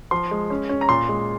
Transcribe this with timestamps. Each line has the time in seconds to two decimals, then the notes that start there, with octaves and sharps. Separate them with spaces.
0.11 F3 C6
0.31 G#3
0.50 C#4
0.69 C#4
0.81 A#5
0.89 A#2 C6
1.09 G#3